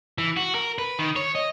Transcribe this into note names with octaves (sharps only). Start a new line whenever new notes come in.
E3
F#4
A#4
B4
D#3
C#5
D#5